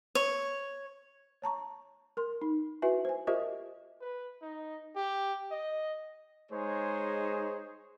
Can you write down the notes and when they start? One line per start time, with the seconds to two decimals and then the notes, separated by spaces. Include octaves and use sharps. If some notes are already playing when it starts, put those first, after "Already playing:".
0.15 C#5
1.42 C#5 A5 A#5 C#6
2.17 A#4 C6
2.42 D#4
2.82 E4 F#4 B4 E5 G#5
3.05 C5 G#5
3.27 F4 G4 A#4 C5 D#5 E5
4.01 B4
4.41 D#4
4.96 G4
5.51 D#5
6.51 G#3 D#4 G#4 C5 C#5